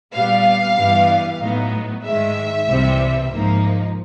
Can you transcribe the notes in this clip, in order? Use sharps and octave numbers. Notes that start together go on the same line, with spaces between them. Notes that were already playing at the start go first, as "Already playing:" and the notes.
A#2 G3 B3 F5
G2 E3 G3 B3
A2 F#3 B3 D#4
G#2 D#3 G#3 E5
C2 C3 E3 G3 C4
G#2 F3 A#3 D#4